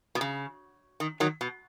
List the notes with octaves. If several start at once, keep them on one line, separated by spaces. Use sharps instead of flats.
B2
C#3
D#3
D#3 F#3
B2